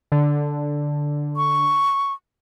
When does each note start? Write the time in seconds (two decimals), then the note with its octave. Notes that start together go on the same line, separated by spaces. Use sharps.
0.12 D3
1.37 C#6